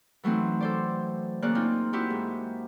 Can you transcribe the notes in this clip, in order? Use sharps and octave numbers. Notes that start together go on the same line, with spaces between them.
E3 F#3 A3 C4 D#4
A4 C5 D5
C#3 A#3 D5 F#6
C4 D#4 F4
C4 E4 F#4 G4
G#2